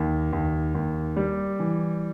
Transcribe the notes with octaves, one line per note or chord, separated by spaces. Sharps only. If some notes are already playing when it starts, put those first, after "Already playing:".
Already playing: D#2
D#2
D#2
G3
E3